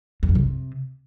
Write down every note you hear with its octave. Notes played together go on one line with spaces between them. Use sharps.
F2
F#2
C3